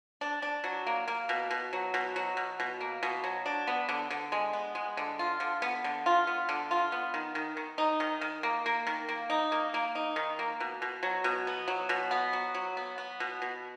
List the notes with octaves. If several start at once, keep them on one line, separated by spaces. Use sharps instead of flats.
D4
D4
F#3
A#3
A#3
B2
B2
F#3
B2
F#3
B2
B2
A#3
B2
F#3
D4
B3
D3
D3
G#3
B3
G#3
D3
F4
D3
B3
D3
F4
B3
D3
F4
B3
D#3
D#3
D#3
D#4
D#3
D#3
A#3
A#3
D#3
A#3
D#4
A#3
A#3
D#4
D#3
A#3
B2
B2
F#3
B2
B3
F#3
B2
B3
F#3
F#3
B3
B3
B2
B2